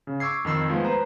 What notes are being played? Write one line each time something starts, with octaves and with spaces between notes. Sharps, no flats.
C#3
C#6 D6 E6 G#6 C7
F2 D#3 E6 C7
F3 G#3 A3 B3
B4 C5 A#5